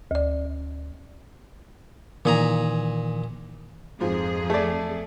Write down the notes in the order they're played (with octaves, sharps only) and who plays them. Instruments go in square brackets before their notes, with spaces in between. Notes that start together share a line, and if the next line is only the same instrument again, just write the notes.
[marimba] D2 D5
[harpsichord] A#2 G#4 A#5 [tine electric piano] D#3 E3
[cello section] F2 G#4 [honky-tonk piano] G#2 F3
[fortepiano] A3 D5 [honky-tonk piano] A4